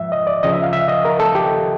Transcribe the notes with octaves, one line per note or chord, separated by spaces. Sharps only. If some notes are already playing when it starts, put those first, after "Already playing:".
Already playing: G#2 F3 E5
D#5
D5
D2 C#3 F3 D#5
E5
F5
E5
D#5
A#4
A4
G4